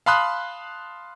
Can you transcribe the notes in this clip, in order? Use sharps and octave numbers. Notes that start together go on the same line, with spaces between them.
F5 A5 B5 C6 D#6 F#6